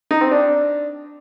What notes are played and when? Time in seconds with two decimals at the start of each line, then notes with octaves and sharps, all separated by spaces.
0.11 D#4
0.21 C4
0.31 D4